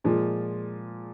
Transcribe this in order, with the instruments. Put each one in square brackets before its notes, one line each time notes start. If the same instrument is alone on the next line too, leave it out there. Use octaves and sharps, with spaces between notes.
[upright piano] A#2 F3 G#3